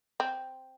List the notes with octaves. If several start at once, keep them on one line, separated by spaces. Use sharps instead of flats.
C4